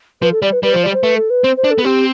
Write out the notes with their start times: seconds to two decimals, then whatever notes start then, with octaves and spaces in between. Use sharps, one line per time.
0.22 F3 B4
0.32 A4
0.42 G3 D5
0.53 B4
0.63 G3 B4
0.73 F3 C5
0.84 G3 D5
0.94 C5
1.03 A3 B4
1.17 A4
1.30 B4
1.44 C4 C5
1.57 C5
1.64 D4
1.71 A4
1.78 B3
1.84 C4 G4